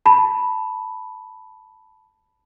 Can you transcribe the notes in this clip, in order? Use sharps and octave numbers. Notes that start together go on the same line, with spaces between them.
A5 B5